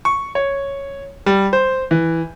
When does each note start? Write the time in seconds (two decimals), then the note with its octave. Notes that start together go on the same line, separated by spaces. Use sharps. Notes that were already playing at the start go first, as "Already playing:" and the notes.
0.05 C#6
0.35 C#5
1.26 G3
1.53 C5
1.91 E3